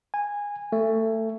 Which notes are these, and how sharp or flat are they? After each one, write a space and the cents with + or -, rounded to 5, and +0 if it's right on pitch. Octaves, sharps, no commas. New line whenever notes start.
G#5 -15
A3 +20